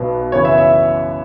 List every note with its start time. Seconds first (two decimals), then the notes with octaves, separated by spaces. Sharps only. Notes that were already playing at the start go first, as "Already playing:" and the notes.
Already playing: B1 B2 B3
0.32 F#2 C#3 E3 B3 C#5
0.45 E5
0.58 E5